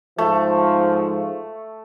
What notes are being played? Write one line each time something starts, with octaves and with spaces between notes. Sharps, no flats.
G#2 F3 A3